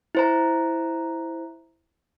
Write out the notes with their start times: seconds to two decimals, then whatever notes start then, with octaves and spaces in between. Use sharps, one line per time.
0.15 E4 C5 A#5